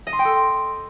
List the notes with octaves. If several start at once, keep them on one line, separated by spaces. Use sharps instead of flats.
D#5
C6
G5
A4